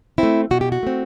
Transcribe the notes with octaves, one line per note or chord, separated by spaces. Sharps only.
A3 C4 E4
B2 F#4
G4
F#4
A3 C4